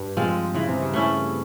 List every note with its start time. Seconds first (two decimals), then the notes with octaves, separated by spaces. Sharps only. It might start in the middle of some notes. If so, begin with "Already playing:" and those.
Already playing: G2
0.17 F3 G#3 C4
0.54 C#3 E3
0.69 C3
0.82 C#3
0.93 A3 C#4 E4